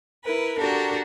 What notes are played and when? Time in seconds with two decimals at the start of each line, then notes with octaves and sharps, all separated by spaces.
0.25 E4 A#4 B4
0.58 D4 F#4 G4 A4 A#4